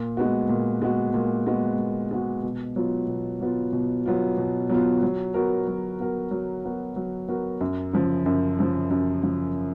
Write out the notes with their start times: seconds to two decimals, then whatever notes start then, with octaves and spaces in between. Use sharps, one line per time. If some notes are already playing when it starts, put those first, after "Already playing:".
Already playing: A#2
0.17 G#3 B3 F#4
0.49 A#2
0.82 G#3 B3 F#4
1.14 A#2
1.47 G#3 B3 F#4
1.79 A#2
2.11 G#3 B3 F#4
2.43 B2
2.76 F#3 B3 F4
3.08 B2
3.41 F#3 B3 F4
3.73 B2
4.06 F#3 B3 F4
4.38 B2
4.69 F#3 B3 F4
5.03 F#3
5.34 B3 F#4 A#4
5.68 F#3
6.00 B3 F#4 A#4
6.31 F#3
6.64 B3 F#4 A#4
6.96 F#3
7.29 B3 F#4 A#4
7.61 F#2
7.93 C#3 F3
8.26 F#2
8.59 C#3 F3
8.91 F#2
9.23 C#3 F3